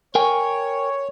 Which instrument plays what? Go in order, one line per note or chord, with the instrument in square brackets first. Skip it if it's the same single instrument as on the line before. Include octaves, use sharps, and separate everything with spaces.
[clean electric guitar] A#4 G5 G#5 [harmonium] C#5